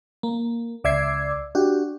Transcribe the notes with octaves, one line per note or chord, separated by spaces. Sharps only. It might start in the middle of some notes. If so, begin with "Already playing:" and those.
A#3
C#2 D5 E5 D6 G#6 C7
D4 F#4 G4